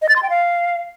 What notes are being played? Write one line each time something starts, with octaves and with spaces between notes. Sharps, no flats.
D#5
A6
C6
G5
F5